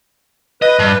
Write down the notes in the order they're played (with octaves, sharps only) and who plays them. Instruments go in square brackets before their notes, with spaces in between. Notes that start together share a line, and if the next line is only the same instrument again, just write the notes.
[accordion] B4 [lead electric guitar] D#5
[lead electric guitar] G2